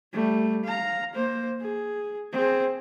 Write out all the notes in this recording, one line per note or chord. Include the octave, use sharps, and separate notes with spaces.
G3 A3
F5 A#5
A#3 C5
G#4
C4 G#4